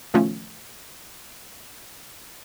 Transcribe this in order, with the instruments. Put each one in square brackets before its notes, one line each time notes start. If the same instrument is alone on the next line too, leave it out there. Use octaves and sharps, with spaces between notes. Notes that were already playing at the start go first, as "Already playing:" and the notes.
[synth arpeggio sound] B2 D#3 F3 A3 C#4 F4